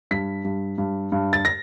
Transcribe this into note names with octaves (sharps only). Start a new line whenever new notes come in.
G2 B6
G2
G2
G2
A6
A#6